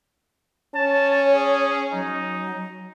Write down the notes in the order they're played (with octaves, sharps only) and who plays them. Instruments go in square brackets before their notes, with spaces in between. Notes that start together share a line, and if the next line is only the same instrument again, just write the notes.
[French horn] C#4 [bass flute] C#5 [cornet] A5
[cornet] G#4
[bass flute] F#3 [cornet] D#4